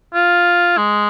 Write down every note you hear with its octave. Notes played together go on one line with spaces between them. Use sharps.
F4
G#3